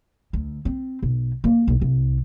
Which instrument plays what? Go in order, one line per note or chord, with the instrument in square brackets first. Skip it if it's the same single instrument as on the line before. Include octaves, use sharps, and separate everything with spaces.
[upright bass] D2
C4
B1
A#3
B1
C2